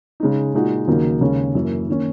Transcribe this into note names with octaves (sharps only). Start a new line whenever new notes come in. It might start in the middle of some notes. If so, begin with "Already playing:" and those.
C#3 G#3 D#4
A#2 G#3 D#4 F#4
D#2 C#3 F#3 A#3 D#4
D#2 C#3 G#3 C#4
F#2 E3 A#3
D#3 A#3 C#4